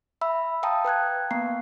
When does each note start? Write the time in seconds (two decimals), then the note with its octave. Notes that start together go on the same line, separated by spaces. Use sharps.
0.21 E5 B5 E6
0.63 F5 G5 A5 A#5 D#6
0.85 B4 G5 F#6 G#6
1.31 A#3 B3 F5 A#5 C7